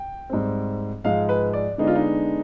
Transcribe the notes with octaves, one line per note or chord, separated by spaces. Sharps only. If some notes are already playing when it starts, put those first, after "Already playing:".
Already playing: G5
G#2 G3 C4
G#2 F3 G#3 F5
B4
D5
D3 G#3 B3 D4 D#4
F4
D#4